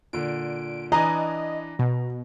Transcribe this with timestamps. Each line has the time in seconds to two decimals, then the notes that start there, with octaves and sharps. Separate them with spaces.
0.13 A#2 D3 D7
0.92 E3 D4 D#5 G#5 A#5
1.79 B2